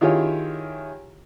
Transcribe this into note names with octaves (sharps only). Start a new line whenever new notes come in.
D#3 E4 F4 G4 G#4 C#5